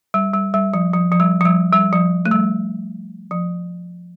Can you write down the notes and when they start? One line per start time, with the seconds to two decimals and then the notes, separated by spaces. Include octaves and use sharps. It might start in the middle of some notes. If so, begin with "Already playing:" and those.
0.14 G3
0.34 G3
0.54 G3
0.74 F3
0.94 F3
1.12 F3
1.20 G3
1.41 F3
1.45 G3
1.73 G3
1.93 F3
2.26 A3
2.31 G3
3.31 F3